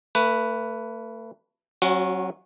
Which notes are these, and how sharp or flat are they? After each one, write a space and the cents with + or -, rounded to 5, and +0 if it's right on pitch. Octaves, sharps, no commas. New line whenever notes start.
A3 +35 B4 +0
F#3 +20 C#4 -35 F#4 -25